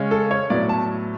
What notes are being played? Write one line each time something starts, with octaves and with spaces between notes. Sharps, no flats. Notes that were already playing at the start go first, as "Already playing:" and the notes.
Already playing: C#3 G#3 C#4
A4
C#5
A2 F#3 B3 D5
A5